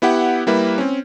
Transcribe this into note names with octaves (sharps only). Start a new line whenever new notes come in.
B3 E4 G4 F#5
G3 A#3 E4 B4
C4 C#4